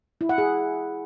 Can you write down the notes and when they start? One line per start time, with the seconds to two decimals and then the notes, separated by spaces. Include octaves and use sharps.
0.21 E4
0.29 F#5
0.38 G#4